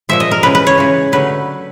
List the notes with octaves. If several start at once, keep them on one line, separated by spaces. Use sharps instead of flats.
A#2 F3 G#3 E5
D#5
A#4
C#3 E3 G#3 B4
B4
C#5
C#3 E3 G#3
D3 F#3 A3 B4